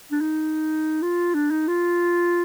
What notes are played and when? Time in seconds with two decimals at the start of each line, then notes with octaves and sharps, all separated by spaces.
0.11 D4
0.21 D#4
1.02 F4
1.34 D4
1.51 D#4
1.68 F4